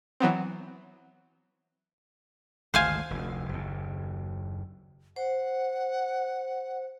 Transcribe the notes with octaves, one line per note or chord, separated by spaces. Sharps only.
E3 F#3 B3 C4
G#1 D2 C5 F5 G#5
F1 D2
F#1 D#2
C5 F#5